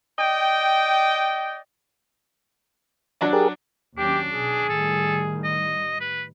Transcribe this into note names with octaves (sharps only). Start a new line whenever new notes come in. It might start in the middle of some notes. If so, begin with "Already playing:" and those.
D5 D#5 G5
F#3 D4 D5
G4 G#4 A#4
D#2 F#3 C#4 D4 G4
B1 B2 G#4
A2 D#3 G3 A4
D#5
B4